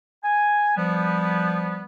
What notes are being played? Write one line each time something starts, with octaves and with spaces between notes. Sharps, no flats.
G#5
F3 G3 B3